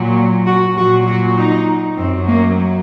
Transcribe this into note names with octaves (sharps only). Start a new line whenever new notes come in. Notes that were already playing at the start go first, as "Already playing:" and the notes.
Already playing: A#2 F#3
F#4
A#2 F#3 F#4
F#4
D#4
F#2 F#3 C4
A#3